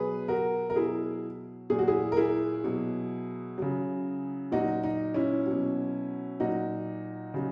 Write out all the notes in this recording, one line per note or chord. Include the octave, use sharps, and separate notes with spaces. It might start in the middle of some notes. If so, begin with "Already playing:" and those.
Already playing: B2 F#3 G#4 B4
F#4 A#4
A#4
B2 F#3 E4 G#4
A#2 F#3 G#4
F#4
E4 G#4
A#4
E4 G#4
B2 F#3
C#3 F#3
A#2 F#3 D#4 F#4
D#4
C#4 E4
B2 F#3
A#2 F#3 D#4 F#4
C#3 F#3